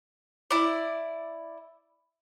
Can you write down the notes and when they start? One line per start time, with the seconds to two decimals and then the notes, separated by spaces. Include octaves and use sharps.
0.51 E4 D5